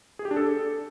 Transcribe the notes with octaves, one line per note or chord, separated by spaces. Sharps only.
G#4
G4
D4
A4